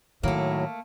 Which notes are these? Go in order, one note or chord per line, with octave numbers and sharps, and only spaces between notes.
A2 D#3 F#3 A3 A#3